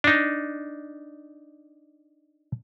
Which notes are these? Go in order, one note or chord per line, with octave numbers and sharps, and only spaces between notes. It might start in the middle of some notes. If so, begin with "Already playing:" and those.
D4 D#4